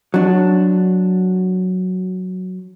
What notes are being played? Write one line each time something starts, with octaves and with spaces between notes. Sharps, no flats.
F#3 D4